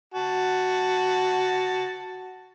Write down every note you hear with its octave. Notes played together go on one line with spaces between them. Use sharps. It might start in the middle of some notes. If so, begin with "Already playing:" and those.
F#4 A5